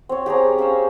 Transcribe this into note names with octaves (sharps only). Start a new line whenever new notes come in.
C4 C#5
G4 G#4 C#5 A#5
C#4 F5 E6